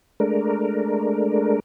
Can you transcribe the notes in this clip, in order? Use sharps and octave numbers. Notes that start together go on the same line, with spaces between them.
G#3 A3 D4 A#4